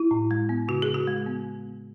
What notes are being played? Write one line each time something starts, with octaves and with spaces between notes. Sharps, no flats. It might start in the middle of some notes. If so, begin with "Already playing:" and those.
Already playing: E4
A2
G#3
B3
C#3 F#4
G#4
C#3
F#4
G#3
B3